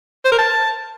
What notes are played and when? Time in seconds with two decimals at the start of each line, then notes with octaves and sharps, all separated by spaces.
0.25 C5
0.32 A#4
0.38 A5